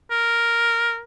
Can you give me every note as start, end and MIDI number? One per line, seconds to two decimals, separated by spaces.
0.11 1.01 70